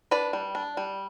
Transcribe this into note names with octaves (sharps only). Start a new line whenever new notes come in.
D4 B4 D5
G3
D4
G3